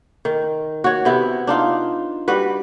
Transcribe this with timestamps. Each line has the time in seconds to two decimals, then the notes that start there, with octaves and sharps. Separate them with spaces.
0.25 D#3
0.84 F#4 C#5
1.05 C3 B3 E4
1.47 D4 D#4 F4
2.28 G3 F#4 B4